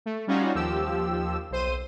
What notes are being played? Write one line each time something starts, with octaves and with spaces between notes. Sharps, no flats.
A3
G3 C#4 D#4 F4 F#4
D#2 F3 G4 E6
B1 C5 D#7